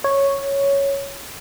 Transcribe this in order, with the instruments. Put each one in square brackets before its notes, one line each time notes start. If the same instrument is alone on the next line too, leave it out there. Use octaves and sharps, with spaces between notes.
[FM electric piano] C#5